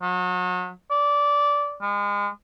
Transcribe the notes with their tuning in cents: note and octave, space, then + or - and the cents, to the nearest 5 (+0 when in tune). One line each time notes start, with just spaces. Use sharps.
F#3 -35
D5 -15
G#3 -35